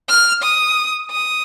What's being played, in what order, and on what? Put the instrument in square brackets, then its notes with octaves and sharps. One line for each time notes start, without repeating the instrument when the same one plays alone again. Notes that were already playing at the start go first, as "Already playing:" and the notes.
[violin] F6
D#6
D#6